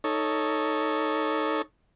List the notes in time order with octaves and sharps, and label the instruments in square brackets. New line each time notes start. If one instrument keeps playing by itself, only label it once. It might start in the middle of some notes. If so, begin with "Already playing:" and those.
[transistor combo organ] D#4 A4 C#5